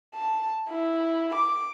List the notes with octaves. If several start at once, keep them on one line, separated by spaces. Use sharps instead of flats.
A5
E4
D6